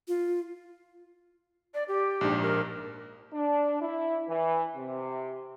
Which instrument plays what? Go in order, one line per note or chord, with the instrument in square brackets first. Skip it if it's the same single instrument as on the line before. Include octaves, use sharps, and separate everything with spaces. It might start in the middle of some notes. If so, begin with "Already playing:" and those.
[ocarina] F4
[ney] D5
G4
[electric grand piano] A#1 G#2 D4
[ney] A#4
[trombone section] D4
E4
E3
C3